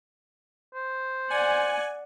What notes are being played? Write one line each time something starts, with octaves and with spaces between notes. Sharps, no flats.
C5
D5 F#5 G#5